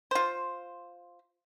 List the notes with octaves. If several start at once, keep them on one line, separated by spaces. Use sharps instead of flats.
F4 C5